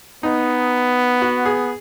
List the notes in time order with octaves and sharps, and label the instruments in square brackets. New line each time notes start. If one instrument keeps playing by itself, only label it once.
[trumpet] B3 [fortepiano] D#4
[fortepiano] F#4
G#4